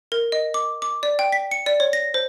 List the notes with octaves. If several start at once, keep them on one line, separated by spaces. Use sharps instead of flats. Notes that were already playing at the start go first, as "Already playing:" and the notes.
A#4
D#5
D6
D6
D5
G5
B6
C#7
D5
C#5
A#6
C5